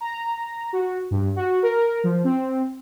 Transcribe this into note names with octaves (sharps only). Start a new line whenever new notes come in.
A#5
F#4
G2
F#4
A#4
F3
C4